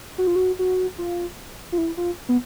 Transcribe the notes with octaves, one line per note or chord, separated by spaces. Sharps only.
F#4
F4
F#4
F#4
F4
F4
E4
F4
B3